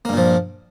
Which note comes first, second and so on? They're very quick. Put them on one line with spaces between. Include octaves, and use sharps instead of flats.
A#3 G2 A#2 F3